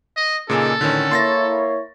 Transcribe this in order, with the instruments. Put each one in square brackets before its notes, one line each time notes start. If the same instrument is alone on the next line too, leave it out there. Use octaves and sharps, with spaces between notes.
[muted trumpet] D#5
[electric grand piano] A#2 C#3 A#3 [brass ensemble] D#4 G#4 [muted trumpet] A4
[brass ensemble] A1 [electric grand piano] D3 D#3 C#4
[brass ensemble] A#3 E4 C#5 [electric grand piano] C6 A6 A#6